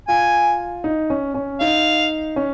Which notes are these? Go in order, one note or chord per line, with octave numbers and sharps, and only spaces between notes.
F4 G#5
D#4
C#4
C#4
D#4 F5
C#4